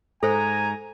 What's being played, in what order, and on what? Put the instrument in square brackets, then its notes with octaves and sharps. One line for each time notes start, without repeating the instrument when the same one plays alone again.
[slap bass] G#2 [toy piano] A4 C5 [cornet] G#5 [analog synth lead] A#5